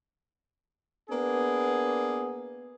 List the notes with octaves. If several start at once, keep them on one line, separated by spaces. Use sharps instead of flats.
A#3 B3 D4 G#4